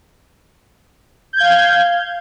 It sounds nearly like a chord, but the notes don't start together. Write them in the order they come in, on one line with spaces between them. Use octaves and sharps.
G6 G#6 F5